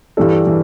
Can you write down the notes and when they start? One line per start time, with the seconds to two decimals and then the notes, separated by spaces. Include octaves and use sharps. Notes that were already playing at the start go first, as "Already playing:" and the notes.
0.17 G2 E3 G3 D4 A4
0.47 E3